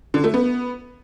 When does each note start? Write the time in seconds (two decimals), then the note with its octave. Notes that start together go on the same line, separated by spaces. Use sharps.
0.14 D3
0.24 A3
0.34 B3